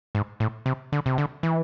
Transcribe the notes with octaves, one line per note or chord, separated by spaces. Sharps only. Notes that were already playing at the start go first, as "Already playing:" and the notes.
G#2
A2
C3
D3
C3
D3
E3